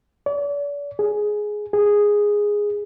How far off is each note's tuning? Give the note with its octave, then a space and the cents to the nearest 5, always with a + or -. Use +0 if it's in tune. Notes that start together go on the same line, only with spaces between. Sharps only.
D5 -40
G#4 +10
G#4 -5